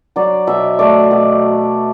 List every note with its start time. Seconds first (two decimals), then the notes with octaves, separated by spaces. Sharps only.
0.16 F#3 D5
0.47 B2 E5
0.79 A3 D5
1.11 B2